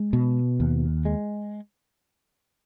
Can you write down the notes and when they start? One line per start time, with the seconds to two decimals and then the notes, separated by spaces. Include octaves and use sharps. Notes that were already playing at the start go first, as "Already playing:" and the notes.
Already playing: G#3
0.13 B2
0.60 D#2
1.05 G#3